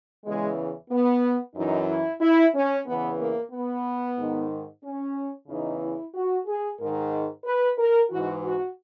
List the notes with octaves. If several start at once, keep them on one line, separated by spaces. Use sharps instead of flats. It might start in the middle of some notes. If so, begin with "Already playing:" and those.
E2 C#3 E3 G#3
B3
F#2 E3 D#4
E4
E4
C#4
E2 C#3 E3 B3
A#3
B3
G#2 D#3
C#4
E2 C#3 E3 D#4
E4
F#4
G#4
G#2 D#3 A#4
B4
A#4
G#2 E3 F#4
F#4